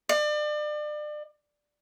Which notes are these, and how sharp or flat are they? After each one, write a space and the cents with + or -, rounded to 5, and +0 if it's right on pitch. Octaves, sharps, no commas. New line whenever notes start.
D5 +35